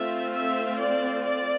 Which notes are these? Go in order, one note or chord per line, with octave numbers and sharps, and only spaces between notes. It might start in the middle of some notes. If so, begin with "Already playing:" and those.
Already playing: A3 C4 F4 E5
E5
D5
D5